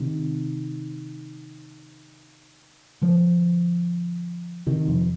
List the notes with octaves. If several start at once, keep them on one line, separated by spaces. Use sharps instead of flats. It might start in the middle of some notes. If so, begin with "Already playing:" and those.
Already playing: C3 D#3
D3 F3
C3 D#3
F2